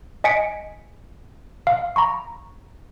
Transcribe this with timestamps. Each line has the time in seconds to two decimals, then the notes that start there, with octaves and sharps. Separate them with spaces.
0.24 D#5 G#5 B6 C#7 D7
1.67 F5
1.96 A#5 B5 C#6